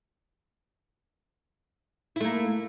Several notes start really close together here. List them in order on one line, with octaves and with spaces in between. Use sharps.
E4 A3 A#3